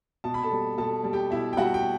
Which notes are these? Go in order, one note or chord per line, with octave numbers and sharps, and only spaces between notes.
B2 A5
B5
A4 A5
G3
B2 A4 A5
G3
G4 G5
B2 E4 E5
G5
G3 F#4 F#5
G5